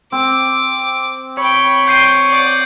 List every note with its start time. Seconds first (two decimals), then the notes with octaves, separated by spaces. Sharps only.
0.12 C4 D6
1.37 C#5 G5 B5
1.88 G5 C6 G6 C7 D#7
2.28 D5 F#5